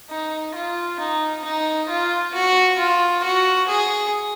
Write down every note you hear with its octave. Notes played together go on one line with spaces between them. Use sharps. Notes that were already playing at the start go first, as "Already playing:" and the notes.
D#4
F4
D#4
D#4
F4
F#4
F4
F#4
G#4